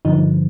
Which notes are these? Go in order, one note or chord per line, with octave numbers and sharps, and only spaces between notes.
G2 D3 F3 D#4